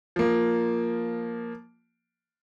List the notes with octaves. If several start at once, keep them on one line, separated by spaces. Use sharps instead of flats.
F3 A#3